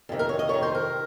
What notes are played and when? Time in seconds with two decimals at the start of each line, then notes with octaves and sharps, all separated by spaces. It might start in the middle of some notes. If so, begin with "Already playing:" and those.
0.09 F2 C3 D#3
0.19 A#4
0.29 C#5
0.39 D#5
0.49 F2 C3 D#3 C#5
0.62 C5
0.75 A#4